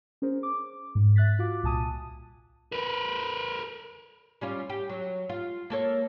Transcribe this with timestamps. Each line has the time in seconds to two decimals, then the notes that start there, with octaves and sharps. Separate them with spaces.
0.22 C#4 G#4 A#4 C5
0.43 D6
0.95 G#2
1.16 E5 F#6 A6 B6
1.39 F4 F#4 F5 D6
1.63 C2 A#2 G#5 A5 D#6 D#7
2.72 A#4 B4
4.41 G3 C#4 F4
4.70 G4
4.89 F#3
5.29 F4
5.70 A#3 A4 C#5